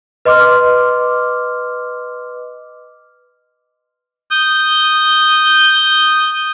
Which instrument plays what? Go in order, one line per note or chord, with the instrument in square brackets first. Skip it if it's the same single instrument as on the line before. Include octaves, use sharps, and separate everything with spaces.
[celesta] B4 D#5 C6 D6 F6
[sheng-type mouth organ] D#6 G6